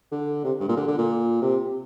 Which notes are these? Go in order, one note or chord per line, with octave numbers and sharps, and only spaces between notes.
D3
C3
G2
A#2
D3
D3
A#2
C3